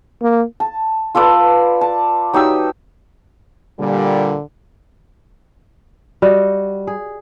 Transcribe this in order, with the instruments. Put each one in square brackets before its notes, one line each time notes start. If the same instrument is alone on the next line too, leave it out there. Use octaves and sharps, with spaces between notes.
[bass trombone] A#3
[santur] A5
F4 A4 B4 D5
A5
F#3 D#4 G4 E6
[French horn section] A#2 G3 [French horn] D3
[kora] G3 F#4 D#5
G#4